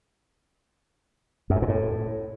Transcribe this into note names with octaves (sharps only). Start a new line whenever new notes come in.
F#2
G#2
A#2
A2